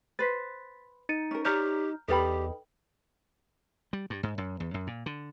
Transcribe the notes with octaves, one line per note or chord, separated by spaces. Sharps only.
B4 C5 A6 B6
D#4 A6 C#7 D#7
C#4 A#4
G4 C#5 D5 A#5 F6 G6
E2 D#4 G4 A4 B4 D5 G5 B5
G3
G2
G#2
F#2
E2
F#2
A#2
D3